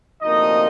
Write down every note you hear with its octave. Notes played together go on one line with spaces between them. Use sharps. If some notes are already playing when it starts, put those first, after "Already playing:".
D2 C3 F3 A#3 D#4 D#5